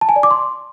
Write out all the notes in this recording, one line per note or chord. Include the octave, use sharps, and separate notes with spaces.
A5
G#5
D5
D6
C6